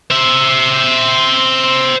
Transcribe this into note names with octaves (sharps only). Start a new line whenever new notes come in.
C5 E5